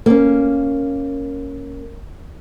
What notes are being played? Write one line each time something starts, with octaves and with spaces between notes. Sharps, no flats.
A#3 C#4